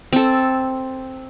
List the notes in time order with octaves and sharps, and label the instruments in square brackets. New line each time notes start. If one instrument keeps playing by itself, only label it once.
[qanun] C4 A4